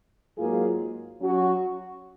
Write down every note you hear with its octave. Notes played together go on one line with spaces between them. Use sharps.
G#2 F#3 A#3 F4 G#4
F#3 C#4 F#4